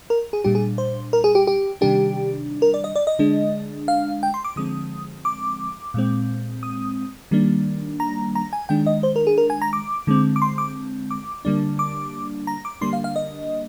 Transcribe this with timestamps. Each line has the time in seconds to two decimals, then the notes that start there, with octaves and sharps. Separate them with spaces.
0.10 A#4
0.33 G#4
0.44 A#2 G3 D4 G4
0.55 G#4
0.78 C5
1.13 A#4
1.24 G#4
1.35 G4
1.47 G4
1.81 C3 D#3 G3 D4 G4
2.62 A#4
2.74 D5
2.84 D#5
2.95 D5
3.07 D#5
3.19 D3 G#3 D4
3.88 F5
4.23 G5
4.34 C6
4.45 D6
4.56 D3 F3 G#3 C4 D#6
5.25 D6
5.94 A#2 G#3 C4
6.63 D#6
7.31 D#3 G3 A#3 D4
8.00 A#5
8.35 A#5
8.53 G#5
8.69 D#3 G#3 D4 G5
8.86 D#5
9.03 C5
9.16 A#4
9.27 G#4
9.38 A#4
9.50 G#5
9.62 A#5
9.73 D6
10.07 D3 G#3 C4
10.36 D6
10.42 C6
10.58 D6
11.11 D6
11.45 D3 G3 A#3 D4
11.79 D6
12.47 A#5
12.65 D6
12.81 D3 G3 A#3 D4 C6
12.93 F5
13.04 F5
13.16 D#5